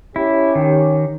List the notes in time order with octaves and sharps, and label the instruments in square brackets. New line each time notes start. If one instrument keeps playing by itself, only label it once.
[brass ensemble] C#4 G4 C#5 [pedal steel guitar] E4
[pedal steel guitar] D#3